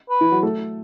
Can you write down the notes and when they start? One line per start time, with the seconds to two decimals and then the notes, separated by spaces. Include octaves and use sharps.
0.10 B4
0.21 E3 E4
0.32 F#3 F#4
0.43 A3 A4